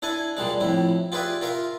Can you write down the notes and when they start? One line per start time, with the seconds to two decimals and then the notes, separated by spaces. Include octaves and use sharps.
0.02 D4 E4 A4 G#5
0.37 A#2 G3 G#3 D4
0.61 F2 A2 E4
1.12 F4 G4 G#4 B4 D5 E5
1.41 F4 A#4 E5 F5